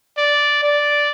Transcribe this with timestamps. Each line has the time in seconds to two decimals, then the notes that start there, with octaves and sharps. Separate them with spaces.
0.18 D5
0.63 D5